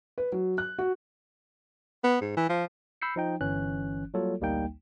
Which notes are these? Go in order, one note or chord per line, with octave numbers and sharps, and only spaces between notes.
B4
F#3
F#6
F#4
B3
G#2
E3
F3
B5 E6 G6 C7 C#7
F3 D#4 G5
G1 E3 C#4 F#6
F#3 G3 A#3 F4 A4 C#5
A1 D2 G3 A#3 D#4 G5